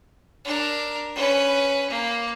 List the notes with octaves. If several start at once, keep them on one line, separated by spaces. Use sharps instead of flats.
D4 A#4
C#4 B4
A#3